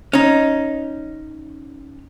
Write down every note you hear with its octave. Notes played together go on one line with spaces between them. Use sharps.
C#4 D#4